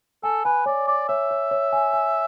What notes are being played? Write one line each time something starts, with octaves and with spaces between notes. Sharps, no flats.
A4 G#5
B4 G#5
C#5 D5
D5 D6
C#5 E5
C#5
C#5
G#5
G#5